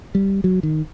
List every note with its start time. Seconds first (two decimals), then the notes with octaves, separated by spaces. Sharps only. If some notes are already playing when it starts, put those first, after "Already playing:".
0.15 G3
0.44 F#3
0.63 D#3